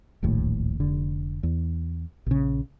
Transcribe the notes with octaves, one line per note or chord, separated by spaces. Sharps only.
D1 A#1 D#2 A2
F1 D3
E2
A#1 C#3